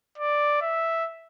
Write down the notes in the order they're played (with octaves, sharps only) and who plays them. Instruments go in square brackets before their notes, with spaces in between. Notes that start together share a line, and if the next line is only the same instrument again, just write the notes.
[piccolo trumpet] D5
E5